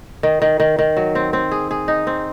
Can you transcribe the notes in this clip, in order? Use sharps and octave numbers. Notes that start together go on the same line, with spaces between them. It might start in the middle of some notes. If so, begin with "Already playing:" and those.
D#3
D#3
D#3
D#3
F#3
C4
C4
G#4
G#4
D#4
C4